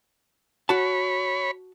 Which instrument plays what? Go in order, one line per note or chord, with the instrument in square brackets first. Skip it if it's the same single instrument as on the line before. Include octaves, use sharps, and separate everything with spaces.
[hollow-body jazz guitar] F#4 A5 [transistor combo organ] C#5 B5